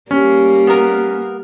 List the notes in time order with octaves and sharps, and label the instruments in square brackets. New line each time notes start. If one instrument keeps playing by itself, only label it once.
[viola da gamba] G3 [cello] A#3 [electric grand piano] C#4
[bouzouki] B3 A#4